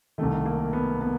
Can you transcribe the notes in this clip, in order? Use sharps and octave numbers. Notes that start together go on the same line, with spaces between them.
C2 C3 D#3 A3
A#3
B3
B3